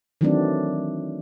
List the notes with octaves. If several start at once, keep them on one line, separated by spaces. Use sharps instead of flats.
D#3 E3 F#3 A3 C4 D4